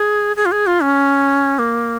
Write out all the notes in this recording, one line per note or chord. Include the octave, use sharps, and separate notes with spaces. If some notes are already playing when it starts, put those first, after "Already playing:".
Already playing: G#4
G#4
F4
G#4
F4
C#4
A#3